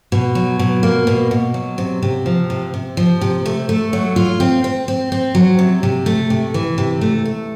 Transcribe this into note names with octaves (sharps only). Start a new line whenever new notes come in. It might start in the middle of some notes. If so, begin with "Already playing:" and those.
B2
F#3
B2
A#3
B2
B2
F#3
C3
C3
F3
C3
C3
F3
C3
A3
A3
F#3
F4
C4
C4
C4
C4
F#3
C3
C3
A3
C3
E3
C3
A3
A3